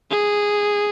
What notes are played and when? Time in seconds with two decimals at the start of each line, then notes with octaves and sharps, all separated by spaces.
0.11 G#4